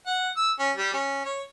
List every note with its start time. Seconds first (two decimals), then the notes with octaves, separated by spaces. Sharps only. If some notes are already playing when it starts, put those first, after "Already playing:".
0.06 F#5
0.37 E6
0.59 C#4
0.76 G3
0.93 C#4
1.25 C#5